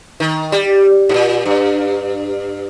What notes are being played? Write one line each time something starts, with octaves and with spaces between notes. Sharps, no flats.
D#3
G3
G#2
A#2
G2